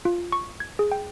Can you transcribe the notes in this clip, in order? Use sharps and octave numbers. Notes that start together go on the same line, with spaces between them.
F4
C#6
G#6
G#4
G5